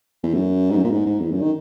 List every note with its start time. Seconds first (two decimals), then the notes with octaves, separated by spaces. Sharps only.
0.23 E2
0.34 F#2
0.71 G#2
0.77 F#2
0.84 A#2
0.91 G#2
1.06 G#2
1.20 E2
1.32 F#2
1.42 D#3